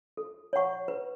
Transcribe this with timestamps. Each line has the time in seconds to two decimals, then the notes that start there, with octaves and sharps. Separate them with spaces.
0.17 A4
0.53 C#5 F#5 C#6
0.88 B4